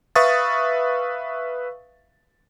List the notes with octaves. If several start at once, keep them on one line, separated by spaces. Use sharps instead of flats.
B4 E5 F5 C#6 D#6 A6